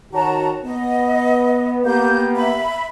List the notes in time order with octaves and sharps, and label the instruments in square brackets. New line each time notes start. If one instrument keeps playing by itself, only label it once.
[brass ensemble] D#3 F#4 C#5 [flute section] A5 A#5
[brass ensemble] B3 [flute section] D#5
[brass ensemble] A#3 B3 G4 [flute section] G6
[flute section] E5 B5